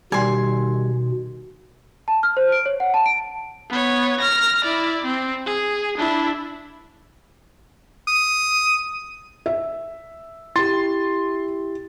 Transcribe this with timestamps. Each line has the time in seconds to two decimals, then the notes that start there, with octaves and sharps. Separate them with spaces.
0.12 B2 D#3 G3 G#5 C6
2.08 A5
2.23 F6
2.37 C5
2.52 D7
2.66 C#5
2.80 F#5
2.94 A5
3.06 D7
3.69 B3 C#5
4.20 F6 A#6
4.64 E4 D5
5.05 C4
5.46 G#4
5.98 D4 E4
8.08 D#6
9.46 E5
10.56 E4 G4 C6 A6